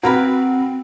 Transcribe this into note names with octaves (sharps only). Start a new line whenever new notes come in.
A#3 C4 F#4 A#4 B4